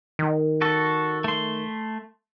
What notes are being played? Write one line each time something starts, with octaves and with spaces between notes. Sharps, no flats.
D#3
F#4 A4
A3 C6